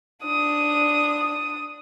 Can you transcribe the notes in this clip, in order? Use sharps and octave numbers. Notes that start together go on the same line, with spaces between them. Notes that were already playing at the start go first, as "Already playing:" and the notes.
D4 D#6